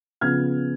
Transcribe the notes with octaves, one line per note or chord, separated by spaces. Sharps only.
C#3 F3 B3 F6 G#6